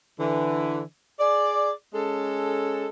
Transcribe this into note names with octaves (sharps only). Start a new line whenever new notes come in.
D3 E3
G#4 D5
G#3 C#4 A4